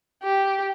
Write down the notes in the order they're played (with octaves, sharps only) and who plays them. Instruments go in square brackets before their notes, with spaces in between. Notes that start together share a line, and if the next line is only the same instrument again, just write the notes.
[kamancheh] G4